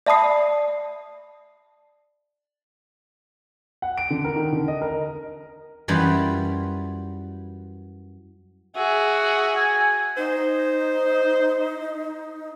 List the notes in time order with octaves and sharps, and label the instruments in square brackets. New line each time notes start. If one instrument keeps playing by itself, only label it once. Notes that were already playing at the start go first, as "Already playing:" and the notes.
[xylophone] D5 E5 A5 B5 D#6 C7
[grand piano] F#5
D7
D3
A#4
D#3
D3
D#5
A#4
[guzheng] F#2 E3 G3 F4 B5
[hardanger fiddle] F#4 G#4 [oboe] E5
[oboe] G#5
[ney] D#4 [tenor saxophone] C5